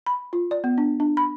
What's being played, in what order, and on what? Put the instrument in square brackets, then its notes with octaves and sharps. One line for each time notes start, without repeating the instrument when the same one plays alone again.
[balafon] B5
F4
D5
B3
D4
D4
B5